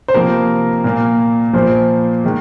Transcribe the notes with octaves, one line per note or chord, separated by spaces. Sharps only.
C5
C3 F3 A#3 A#4
A#2 A#3
A#2 F3 A#3 C5
D#3 G#3